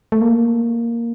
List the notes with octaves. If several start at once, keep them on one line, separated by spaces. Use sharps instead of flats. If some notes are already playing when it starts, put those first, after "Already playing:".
A3
A#3